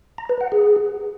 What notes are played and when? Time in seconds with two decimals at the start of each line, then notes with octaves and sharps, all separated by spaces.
0.18 A#5
0.29 B4
0.41 F#5
0.52 G#4